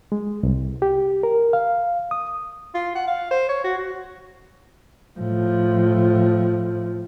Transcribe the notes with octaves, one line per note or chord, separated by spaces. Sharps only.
G#3
C2
G4
A#4
F5
D#6
F4
F#5
F5
C5
C#5
F#4
F#4
A2 F3